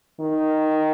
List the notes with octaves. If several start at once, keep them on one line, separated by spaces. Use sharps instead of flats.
D#3